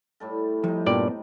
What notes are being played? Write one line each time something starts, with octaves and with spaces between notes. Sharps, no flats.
A2 G3 A4
C3 F3 G3 D#4
G2 A#2 B3 D5 G5 A5